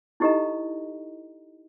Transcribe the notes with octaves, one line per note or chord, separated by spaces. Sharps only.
D#4 E4 G4 A4 D#5 A#5